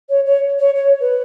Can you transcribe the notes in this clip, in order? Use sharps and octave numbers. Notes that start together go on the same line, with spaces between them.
C#5
C#5
C#5
C#5
B4